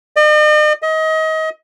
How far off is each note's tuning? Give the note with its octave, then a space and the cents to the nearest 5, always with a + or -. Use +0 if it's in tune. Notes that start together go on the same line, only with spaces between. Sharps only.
D#5 -45
D#5 +30